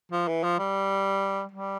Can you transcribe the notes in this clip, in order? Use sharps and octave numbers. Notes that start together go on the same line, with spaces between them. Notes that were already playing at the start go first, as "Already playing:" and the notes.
F3
E3
F3
G3
G3